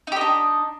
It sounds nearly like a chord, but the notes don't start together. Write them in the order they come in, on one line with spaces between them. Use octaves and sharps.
D#4 G4 D#5 D4